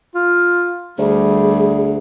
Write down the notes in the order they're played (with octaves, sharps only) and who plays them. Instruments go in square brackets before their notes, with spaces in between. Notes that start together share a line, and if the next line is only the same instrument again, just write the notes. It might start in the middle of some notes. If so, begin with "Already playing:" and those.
[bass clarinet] F4
[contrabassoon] D2 [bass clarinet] G3 [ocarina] G#4